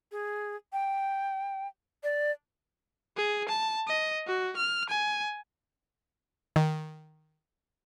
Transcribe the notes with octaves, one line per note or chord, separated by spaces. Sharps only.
G#4
G5
D5
G#4
A5
D#5
F#4
F6
G#5
D#3